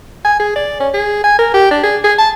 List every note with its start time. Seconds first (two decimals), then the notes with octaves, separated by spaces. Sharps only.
0.25 G#5
0.39 G#4
0.56 D5
0.80 C#4
0.94 G#4
1.24 G#5
1.39 A#4
1.54 G4
1.71 D4
1.83 G#4
2.04 G#4
2.18 A5